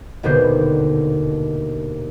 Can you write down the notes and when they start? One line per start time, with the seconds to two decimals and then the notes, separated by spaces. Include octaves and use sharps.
0.23 D#1 D#2 B2 D3 B3 C5